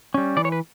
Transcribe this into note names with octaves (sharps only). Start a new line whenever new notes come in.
G3 C#4
E3 D5
C#5
B4